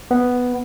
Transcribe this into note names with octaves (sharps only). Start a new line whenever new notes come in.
B3